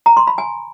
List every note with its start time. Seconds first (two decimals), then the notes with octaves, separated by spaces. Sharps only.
0.06 A#5
0.17 C6
0.27 B5
0.38 G#5